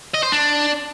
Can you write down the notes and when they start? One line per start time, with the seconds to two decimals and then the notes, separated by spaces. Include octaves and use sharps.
0.14 D#5
0.23 C5
0.32 D4